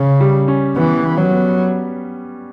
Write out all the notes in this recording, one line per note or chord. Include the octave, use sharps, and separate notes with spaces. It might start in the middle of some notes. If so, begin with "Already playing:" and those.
Already playing: C#3 C#4
G3
C#4
E3 B3
B3
F#3
B3